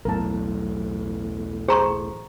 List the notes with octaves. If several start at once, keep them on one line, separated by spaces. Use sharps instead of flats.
B1 E2 A2 A#4 A5
G#4 C5 A#5 C#6